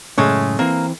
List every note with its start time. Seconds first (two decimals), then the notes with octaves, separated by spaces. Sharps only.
0.18 F#2 A2 C#3 G#3 A3 C#5
0.59 E3 A#3 C4